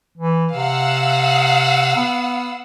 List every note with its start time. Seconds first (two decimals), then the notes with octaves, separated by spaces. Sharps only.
0.17 E3
0.54 C3 F5 F#5 E6
1.96 B3